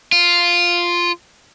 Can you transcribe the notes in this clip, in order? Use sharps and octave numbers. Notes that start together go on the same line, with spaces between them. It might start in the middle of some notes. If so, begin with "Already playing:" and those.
F4